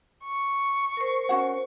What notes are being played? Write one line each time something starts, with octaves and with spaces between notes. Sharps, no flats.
C#6
A#4 C5
C#4 F#4 F#5